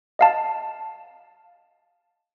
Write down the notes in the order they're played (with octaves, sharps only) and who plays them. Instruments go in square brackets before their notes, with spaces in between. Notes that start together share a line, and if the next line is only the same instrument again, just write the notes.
[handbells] D#5 F5 A5